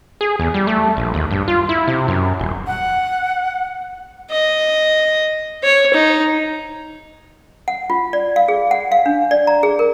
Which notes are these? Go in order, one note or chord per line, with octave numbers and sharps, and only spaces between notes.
G#4
E2
G3
A3
A#1
D#2
G2
F4
E4
C3
F#2
D#1
F#5
D#5
C#5
D#4
F#5
F4
D5
F5
G#4
F#5
F5
D4
D5
A#5
G#4
A#4